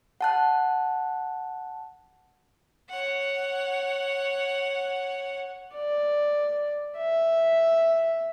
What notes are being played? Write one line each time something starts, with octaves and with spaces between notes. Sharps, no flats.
F#5 A5 F#6
C#5 F#5
D5
E5